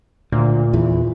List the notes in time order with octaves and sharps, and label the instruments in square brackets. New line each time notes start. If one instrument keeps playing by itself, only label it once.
[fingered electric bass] D2 [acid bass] A#2
[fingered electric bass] E2 E3